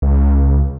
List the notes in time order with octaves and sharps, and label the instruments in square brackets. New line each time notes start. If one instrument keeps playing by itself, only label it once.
[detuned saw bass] C#2